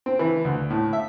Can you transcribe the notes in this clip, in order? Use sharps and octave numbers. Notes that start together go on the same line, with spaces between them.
C4
E3
D2
A2
E5